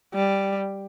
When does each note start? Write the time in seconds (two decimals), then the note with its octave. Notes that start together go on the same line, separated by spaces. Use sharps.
0.14 G3